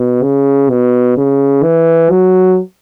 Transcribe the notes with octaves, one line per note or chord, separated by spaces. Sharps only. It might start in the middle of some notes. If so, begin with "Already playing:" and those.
Already playing: B2
C#3
B2
C#3
E3
F#3